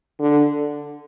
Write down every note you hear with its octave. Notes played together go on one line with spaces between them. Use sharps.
D3